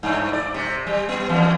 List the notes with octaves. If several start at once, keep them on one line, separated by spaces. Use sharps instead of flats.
G2
D5
C3
G3
B3
E2